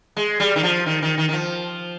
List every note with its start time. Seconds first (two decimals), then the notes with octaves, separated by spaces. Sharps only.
0.16 G#3
0.40 G3
0.56 D#3
0.63 F3
0.86 D#3
1.02 D#3
1.18 D#3
1.29 D#3
1.33 F3